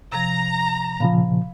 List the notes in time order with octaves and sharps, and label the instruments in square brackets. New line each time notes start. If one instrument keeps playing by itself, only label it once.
[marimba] C3 F3 [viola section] A#5
[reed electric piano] A#2 C#3 F3 [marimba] F5 B5